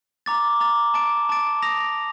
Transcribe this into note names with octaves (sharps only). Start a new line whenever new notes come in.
A#5 D6 A6
A#5 D6 A6
A5 D6 A6 D7
A5 D6 A6 D7
D#6 A#6 F7